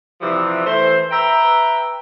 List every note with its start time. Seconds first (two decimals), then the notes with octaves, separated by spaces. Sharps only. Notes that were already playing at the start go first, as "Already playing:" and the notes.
0.21 C3 E3 F3 G3 C4
0.66 E3 A3 C5
1.11 B4 E5 G5 A#5